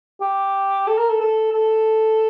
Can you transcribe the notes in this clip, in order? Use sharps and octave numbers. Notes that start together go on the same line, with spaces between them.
G4
A4
A#4
A4
A4
A4